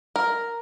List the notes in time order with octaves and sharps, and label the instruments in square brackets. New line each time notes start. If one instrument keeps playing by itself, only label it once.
[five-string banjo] A#4